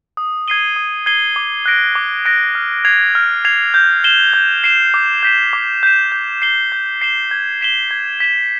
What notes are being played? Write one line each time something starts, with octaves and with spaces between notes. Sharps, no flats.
D#6
G#6 C7 D#7 G7
D#6
G#6 C7 D#7 G7
D6
F#6 A#6 D7
D6
F#6 A#6 D7
F6
G#6 C7 F7
F6
G#6 C7 F7
G6
C7 E7 G7
G6
C7 E7 G7
D6
G6 B6 E7
D6
G6 B6 E7
G6
C7 E7 G7
G6
C7 E7 G7
G#6
B6 E7 G7
G#6
B6 E7 G7